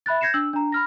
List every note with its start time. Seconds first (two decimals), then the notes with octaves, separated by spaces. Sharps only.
0.06 E5 B5 F#6 A6
0.21 G6 G#6 A#6 C7 C#7 E7
0.34 D4 E6 F#7
0.53 D4 A#5
0.72 B5 F6 A#6